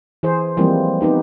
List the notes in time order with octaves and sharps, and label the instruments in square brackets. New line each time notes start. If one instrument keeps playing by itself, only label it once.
[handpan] E3 G#4 C5
E3 F3 G3 G#3 A#3 C4
B3 C4 D#4 G4